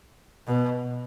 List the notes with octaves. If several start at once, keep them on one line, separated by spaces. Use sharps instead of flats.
B2